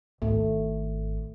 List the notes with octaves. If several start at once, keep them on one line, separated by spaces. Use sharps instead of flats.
G#1 A3